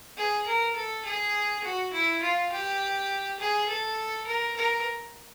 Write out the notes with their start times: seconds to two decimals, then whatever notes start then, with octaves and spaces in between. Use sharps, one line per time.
0.18 G#4
0.47 A#4
0.76 A4
1.05 G#4
1.64 F#4
1.93 E4
2.22 F4
2.52 G4
3.39 G#4
3.69 A4
4.27 A#4
4.56 A#4